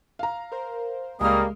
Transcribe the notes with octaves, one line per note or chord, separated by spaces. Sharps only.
F5 A#5
A#4 C5
C#2 G3 G#3 A#3 D#6 F6